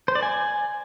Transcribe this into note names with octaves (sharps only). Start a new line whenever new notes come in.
C5
D5
G#5